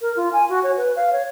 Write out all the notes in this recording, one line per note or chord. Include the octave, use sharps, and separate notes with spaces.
A#4
F4
G#5
F#4
C#5
B4
F5
C#5